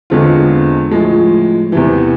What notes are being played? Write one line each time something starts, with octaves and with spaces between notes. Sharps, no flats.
E2 D3 G#3 C4 F4
A2 F3 G#3
E2 C3 E3